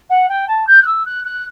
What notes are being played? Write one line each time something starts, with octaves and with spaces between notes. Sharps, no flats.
F#5
G5
A5
G6
F#6
E6
F#6
F#6